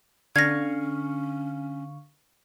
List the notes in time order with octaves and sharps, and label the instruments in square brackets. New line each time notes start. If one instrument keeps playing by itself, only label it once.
[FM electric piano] D3 F5 C#6 [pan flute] C#4 [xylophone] G#6 A#6